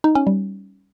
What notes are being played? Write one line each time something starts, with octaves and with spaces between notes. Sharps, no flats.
D#4
C#4
G3